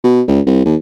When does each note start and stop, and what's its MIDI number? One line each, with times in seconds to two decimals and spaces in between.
0.04 0.22 47
0.28 0.41 37
0.47 0.64 36
0.66 0.76 39